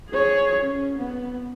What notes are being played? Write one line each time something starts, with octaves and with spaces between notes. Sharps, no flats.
G#4 C#5
C#4
B3